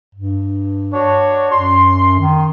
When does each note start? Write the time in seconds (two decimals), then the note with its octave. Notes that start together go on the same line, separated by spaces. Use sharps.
0.15 G2
0.93 D4 F#4 C#5
1.52 F#2 C6
2.19 D#3